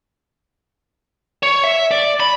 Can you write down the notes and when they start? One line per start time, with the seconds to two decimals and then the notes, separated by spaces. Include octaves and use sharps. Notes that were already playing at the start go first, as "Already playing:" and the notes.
1.43 C#5
1.64 E5
1.91 D5
2.20 B5